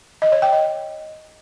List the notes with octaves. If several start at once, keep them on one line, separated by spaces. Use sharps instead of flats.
D#5
C#5
G5
D#5